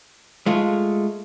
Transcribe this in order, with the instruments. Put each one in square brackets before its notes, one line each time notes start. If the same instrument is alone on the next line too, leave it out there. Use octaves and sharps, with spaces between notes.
[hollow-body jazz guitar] G#3 A3 F4